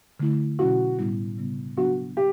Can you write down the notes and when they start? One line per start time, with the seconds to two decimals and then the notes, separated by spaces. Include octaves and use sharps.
0.20 D3 A3 E4
0.59 B2 F#3 C#4 E4 F#4
0.99 A2 G3 B3 E4
1.38 C#3 G3 B3
1.77 C#3 F#3 B3 D4 F#4
2.17 G4